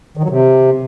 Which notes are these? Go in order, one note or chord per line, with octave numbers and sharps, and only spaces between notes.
D#3
F#3
C3